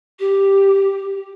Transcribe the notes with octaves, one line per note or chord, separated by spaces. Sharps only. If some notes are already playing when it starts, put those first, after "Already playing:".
G4